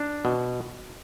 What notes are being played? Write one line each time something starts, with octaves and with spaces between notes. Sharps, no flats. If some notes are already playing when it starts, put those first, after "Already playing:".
Already playing: D4
B2